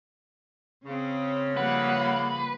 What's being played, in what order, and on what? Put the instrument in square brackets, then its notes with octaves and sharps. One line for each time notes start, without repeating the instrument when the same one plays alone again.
[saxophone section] C#3 [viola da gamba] C4 C#4
[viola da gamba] F3 G3 A#3 [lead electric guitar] B4 [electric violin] F#5